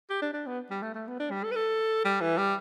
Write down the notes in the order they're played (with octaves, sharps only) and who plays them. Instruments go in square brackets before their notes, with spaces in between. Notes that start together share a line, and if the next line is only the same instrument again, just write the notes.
[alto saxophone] G4
D4
D4
B3
G3
A3
A3
B3
D4
G3
A4
B4
A4
G3
E3
G3